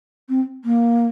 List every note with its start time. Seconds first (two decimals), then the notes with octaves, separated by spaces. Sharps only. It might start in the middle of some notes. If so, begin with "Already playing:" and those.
0.29 C4
0.64 A#3